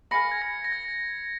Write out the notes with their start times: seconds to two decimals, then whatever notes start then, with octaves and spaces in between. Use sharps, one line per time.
0.11 A#4 F5 G#5 B5 A#6 C#7
0.31 G#6
0.42 A#6
0.64 A#6
0.72 G#6